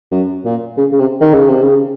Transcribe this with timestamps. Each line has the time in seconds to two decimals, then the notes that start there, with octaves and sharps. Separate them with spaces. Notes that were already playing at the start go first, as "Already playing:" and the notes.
0.11 F#2
0.45 A#2
0.77 C#3
0.92 C#3
0.99 C3
1.21 D#3
1.34 C#3
1.48 C3
1.62 C#3